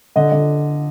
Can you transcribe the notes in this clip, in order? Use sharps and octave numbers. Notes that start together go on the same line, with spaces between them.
D3 D#5
D3